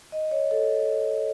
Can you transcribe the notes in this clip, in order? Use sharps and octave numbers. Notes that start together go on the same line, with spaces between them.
D#5
C#5
A4